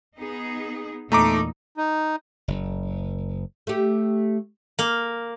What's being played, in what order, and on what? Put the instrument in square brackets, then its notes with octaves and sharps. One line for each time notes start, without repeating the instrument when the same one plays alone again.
[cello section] B3 D#4 G#4
[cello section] E2 A#2 D#4 [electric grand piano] A3 A#5 D6
[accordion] D#4
[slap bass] F#1
[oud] A3 G4
[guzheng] A#3